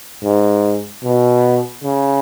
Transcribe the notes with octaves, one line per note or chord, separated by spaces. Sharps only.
G#2
B2
C#3